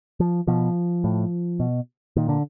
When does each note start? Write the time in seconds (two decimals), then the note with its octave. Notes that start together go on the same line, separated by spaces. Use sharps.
0.20 F3
0.47 B2 F3
1.04 A2
1.60 B2
2.17 A#2 D#3
2.29 D3